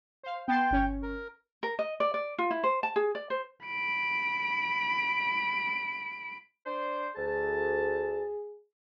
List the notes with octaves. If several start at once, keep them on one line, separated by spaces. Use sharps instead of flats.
C5 F5
B3 G5 A5 C6
G1 C#4 C#5
A#4
A#4
D#5
D5
D5
F4
E4
C5
A5
G#4
D5
C5
B5 D7
D4 C5
D2 G#4 A5